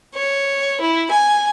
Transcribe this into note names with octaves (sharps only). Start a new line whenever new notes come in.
C#5
E4
G#5